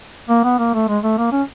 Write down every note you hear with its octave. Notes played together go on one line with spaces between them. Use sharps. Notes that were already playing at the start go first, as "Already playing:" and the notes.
A#3
B3
A#3
A3
G#3
A3
A#3
C#4